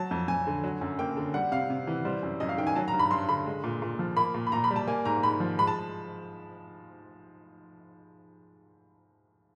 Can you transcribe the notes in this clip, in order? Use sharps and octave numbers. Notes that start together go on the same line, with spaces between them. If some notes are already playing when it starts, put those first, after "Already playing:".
Already playing: F#3 A5
F2
F2 G#5
D3
F#3
F#2
A#3 G5
D3
G3 F#5
C3 F5
C3
E3
G3 C5
F#2
F#2 D#5
F5
D#3 G5
G#5
F#3 A5
A#5
G2
B5
G2 C6
D3 B5
G#3
A#2
A#2
F3
A#3 B5
A#2
B5
A#2 A#5
B5
G3
A5
A#3 G#5
G#2 A#5
G#2 B5
F3
G#3 B5
A5